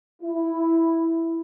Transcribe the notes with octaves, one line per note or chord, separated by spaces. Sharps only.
E4